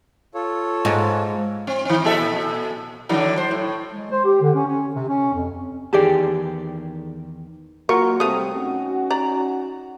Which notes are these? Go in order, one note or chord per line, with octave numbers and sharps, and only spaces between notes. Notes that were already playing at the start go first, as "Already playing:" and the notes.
F4 A4 C#5
G#2
C4
D#3 C4
A#2 A4 E5
D3 D#3 F#3
C5
A2
G#3
C5
G4
D3
C#4
C#4
C3
C#4
F2
E2 D#3 G4 G#4 D5 A5
F#3 A#3 F4 F#4 A#4 C#6
C3 G3 A3 C4 F5 D#6
C#4 D#4 F#4
D5 A#5